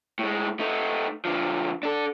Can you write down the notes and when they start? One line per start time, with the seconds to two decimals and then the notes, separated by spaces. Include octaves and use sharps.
0.19 A2 G#3
0.59 A3 D#4
1.25 D3 F3
1.83 D4 A4